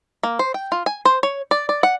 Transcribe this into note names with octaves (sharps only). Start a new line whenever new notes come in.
A#3
C5
G5
F4
G#5
C5
C#5
D5
D5
F#5